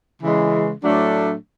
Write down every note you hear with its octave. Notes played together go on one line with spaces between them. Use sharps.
C#3 E3 G#3
A2 F#3 A3 D4